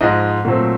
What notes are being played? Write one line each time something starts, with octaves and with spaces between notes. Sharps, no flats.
G#2 F3 G#3 D#5
A#2 F#3 A3 C4